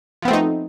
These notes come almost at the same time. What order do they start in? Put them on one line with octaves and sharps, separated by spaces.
F3 B3 C4 A3 D#4